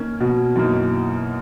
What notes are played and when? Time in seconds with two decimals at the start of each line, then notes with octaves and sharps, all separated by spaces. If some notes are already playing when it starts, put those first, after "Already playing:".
Already playing: D#3 A#3 C#4
0.20 B2
0.56 F#2 E3 A#3 D#4